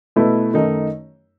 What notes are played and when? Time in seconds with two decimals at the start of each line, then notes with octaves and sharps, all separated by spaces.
0.16 B2 A3 E4 B4 D#5
0.54 F#2 D#3 A3 D#4